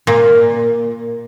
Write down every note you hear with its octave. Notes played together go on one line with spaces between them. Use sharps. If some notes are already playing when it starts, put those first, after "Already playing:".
A#2